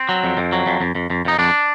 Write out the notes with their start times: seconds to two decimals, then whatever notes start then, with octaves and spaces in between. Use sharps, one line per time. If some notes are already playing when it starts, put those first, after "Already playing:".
Already playing: C4
0.09 F#3
0.24 F2
0.37 F2
0.52 F#3
0.67 F2
0.81 F2
0.95 F2
1.10 F2
1.25 F2 D#4
1.39 F2 D4